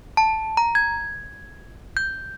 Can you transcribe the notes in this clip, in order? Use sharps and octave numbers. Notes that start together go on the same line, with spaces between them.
A5
A#5
G#6
G6